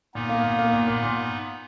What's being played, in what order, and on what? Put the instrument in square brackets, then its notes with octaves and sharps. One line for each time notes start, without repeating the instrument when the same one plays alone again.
[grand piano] A#2 [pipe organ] B3 D#4
[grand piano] A#3
A#2
A#3
A#2
A#2
A#2